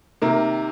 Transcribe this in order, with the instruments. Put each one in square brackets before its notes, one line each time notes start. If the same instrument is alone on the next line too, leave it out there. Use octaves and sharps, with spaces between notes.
[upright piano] C3 D#3 A#3 A#4